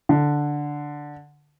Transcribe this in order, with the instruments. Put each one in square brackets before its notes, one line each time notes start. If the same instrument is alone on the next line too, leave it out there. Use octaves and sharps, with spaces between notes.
[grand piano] D3